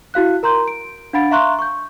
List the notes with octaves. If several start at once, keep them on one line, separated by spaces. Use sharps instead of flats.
E4 F#4 F5 F#6
A#4 A#5 C6 G6
D7
D4 F5 F#5 B5 A6 D7
E5 F5 A#5 C6 C#6 F#6
C#6 G6